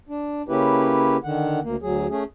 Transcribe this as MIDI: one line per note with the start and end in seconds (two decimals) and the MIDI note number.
0.09 0.42 62
0.48 1.17 49
0.48 1.17 58
0.48 1.17 61
0.48 1.17 64
0.48 1.17 67
0.48 1.17 71
1.24 1.60 50
1.24 1.60 51
1.24 1.60 78
1.63 1.76 38
1.63 1.76 58
1.82 2.07 38
1.82 2.07 54
1.82 2.07 68
2.10 2.24 57
2.10 2.24 61
2.10 2.24 68